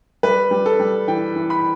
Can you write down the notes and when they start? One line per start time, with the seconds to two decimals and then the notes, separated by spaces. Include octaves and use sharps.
0.23 G3 B4
0.51 G3
0.66 A4
0.80 G3
1.08 E3 G5
1.36 E3
1.50 B5